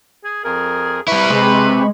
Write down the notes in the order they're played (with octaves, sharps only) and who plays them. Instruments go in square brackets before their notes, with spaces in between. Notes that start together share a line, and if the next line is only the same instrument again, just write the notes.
[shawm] G#4
[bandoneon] F2 A#4 [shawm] G#4
[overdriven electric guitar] G3 E4 [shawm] B4 [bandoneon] B5 C#6
[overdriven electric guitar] C3 [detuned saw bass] G#3